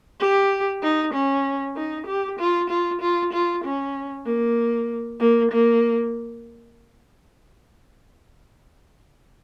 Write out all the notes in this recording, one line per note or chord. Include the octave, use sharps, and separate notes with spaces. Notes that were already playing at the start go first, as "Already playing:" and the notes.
G4
D#4
C#4
D#4
G4
F4
F4
F4
F4
C#4
A#3
A#3
A#3